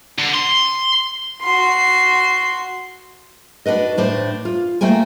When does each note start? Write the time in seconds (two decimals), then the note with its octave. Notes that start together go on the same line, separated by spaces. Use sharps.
0.19 D3
0.35 C6
1.42 F#4 C6
3.66 D4 F#4 B4 D#5
3.97 A2 D4 C5
4.45 F4
4.81 A3 A#3 C5 G5 G#5